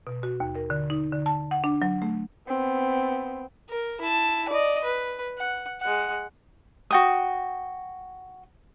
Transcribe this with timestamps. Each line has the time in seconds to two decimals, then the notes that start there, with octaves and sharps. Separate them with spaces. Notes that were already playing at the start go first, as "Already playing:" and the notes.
0.07 B2
0.23 F#4
0.40 D#2
0.55 A#4
0.70 D3
0.90 D#4
1.12 D3
1.26 A5
1.51 F#5
1.64 D4
1.82 F#3
2.02 A3
2.48 B3 C4
3.70 A#4
4.02 E4 A5
4.49 D5 D#5
4.84 B4
5.39 F#5
5.82 G#3 F#5
6.91 F#4 G5 D#6